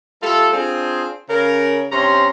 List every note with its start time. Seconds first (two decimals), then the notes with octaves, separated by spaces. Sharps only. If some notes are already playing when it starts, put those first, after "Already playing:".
0.22 G3 A3 F4 A4
0.53 C4 D4 F4 G#4
1.29 C#3 A#4
1.91 G2 C3 C#4 A#5 C6